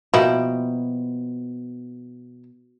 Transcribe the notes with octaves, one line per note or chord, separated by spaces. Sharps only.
B2 F3 A#3 E4 G5